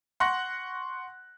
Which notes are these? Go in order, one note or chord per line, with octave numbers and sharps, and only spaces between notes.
F#5 C6 C#6 F#6 A#6 F#7